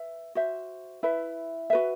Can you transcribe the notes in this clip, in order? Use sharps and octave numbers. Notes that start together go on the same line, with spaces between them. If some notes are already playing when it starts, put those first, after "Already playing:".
Already playing: B4 E5
F#4 C5 E5
E4 B4 E5
F#4 B4 E5